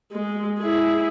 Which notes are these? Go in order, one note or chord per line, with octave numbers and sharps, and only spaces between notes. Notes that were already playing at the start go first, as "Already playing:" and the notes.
G#3
E4 G#4